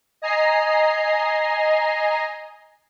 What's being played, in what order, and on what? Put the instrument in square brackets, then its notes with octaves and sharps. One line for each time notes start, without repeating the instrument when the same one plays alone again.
[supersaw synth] D#5 G#5 A#5 C7